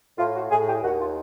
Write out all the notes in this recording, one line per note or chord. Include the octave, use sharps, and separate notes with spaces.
A2 F4
F#4
A2 G#4
G4
D#2 F#4
F4